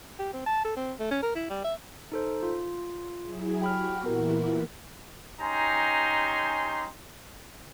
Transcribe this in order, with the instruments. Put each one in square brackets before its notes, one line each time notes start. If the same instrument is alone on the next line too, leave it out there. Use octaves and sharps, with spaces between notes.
[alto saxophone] G4
C4
A5
A4
C4
A3
C#4
A#4
E4
G3
E5
[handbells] D#4 A4 C5
F4
[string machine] F#3 E4 G#4
[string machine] F#4 G4 [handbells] G5 B5 F6
[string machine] A#2 E3 E4 [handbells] B3 A#4
[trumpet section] C#4 D#4 G4 G#5 A#5 C6